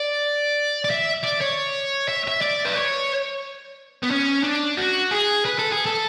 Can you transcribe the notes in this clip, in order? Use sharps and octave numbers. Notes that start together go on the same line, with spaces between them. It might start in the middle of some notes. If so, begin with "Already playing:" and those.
Already playing: D5
D5
E5
D5
C#5
E5
E5
D5
B4
C#5
B3
C#4
D4
F#4
G#4
B4
A4
G#4
A4